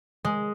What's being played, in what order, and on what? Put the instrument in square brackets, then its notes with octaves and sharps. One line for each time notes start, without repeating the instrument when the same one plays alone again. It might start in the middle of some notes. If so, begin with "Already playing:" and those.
[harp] G#3